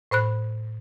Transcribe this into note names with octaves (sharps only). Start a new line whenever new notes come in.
A2 C5 B5 F#6